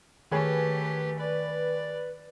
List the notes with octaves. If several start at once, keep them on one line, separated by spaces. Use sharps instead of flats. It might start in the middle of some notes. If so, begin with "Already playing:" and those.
D#3 A3 G4 G#4 B4 C#5 G#5
B4 D5